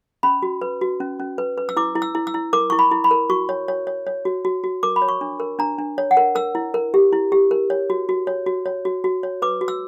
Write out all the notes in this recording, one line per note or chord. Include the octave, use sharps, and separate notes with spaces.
C#4 B5
F#4
B4
F#4
C#4
C#4
B4
B4
E6
E4 D6
E4
E6
E4
E6
E4
A#4 D6
E4 C#6
B5
E4
B5
A#4
F#4 C#6
C#5
C#5
C#5
C#5
F#4
F#4
F#4
A#4 D6
B5
C#5
C#6
D4
A#4
D4 A#5
D4
C#5
F#5
A#4
A#4 E6
E4
A#4
G4
E4
G4
A#4
C#5
F#4
F#4
C#5
F#4
C#5
F#4
F#4
C#5
B4 D6
F#4
E6